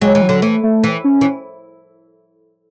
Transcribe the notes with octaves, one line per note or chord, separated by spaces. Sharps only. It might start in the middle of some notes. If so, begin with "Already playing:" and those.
F#3 G#3
E3
F#3
D3
E3 A3
A3
E3
C#4
E3